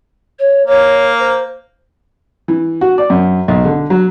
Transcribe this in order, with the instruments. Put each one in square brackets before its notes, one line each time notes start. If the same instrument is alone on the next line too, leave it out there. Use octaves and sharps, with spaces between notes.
[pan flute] C#5
[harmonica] A#3 [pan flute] C#5
[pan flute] C5
[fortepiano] E3
F#4
D5
F#2
B1
D3
F#3